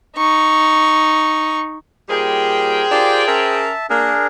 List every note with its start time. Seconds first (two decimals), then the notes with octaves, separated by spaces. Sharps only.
0.17 D#4 C#6
2.09 A#2 G3 G#4 A#4 C5 G5
2.91 F4 G4 A#4 D5
3.27 C#4 A#4 E5 A5
3.90 A#3 D4 G#4 A#4